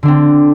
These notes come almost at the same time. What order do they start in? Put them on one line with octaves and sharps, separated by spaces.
D3 D4 C4